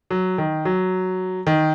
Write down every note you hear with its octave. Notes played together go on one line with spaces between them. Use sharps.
F#3
D#3
F#3
D#3